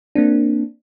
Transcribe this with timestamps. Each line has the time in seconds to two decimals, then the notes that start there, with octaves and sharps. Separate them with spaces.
0.16 A#3 C4 D4